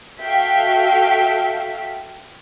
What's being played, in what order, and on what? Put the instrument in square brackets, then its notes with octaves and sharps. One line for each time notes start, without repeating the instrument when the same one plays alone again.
[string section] F#4 A4 E5 F5 G5